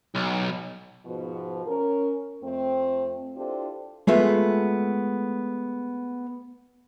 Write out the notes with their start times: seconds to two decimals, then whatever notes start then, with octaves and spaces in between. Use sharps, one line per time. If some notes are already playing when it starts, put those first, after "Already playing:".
0.15 B1
1.06 G#2 B2 F3
1.67 C#4 A#4
2.42 F2 A3 C4
3.36 D4 E4 F4 G4 A4 C5
4.07 G#3 A3 B3 F4